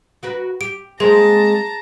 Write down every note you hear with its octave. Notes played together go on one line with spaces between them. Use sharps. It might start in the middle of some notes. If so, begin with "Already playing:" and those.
F#4 A#4 B4
G4 D7
G#3 A#3 C4 G#4 A5 A#5